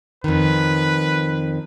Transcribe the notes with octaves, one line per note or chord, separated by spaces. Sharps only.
F2 D#3 B4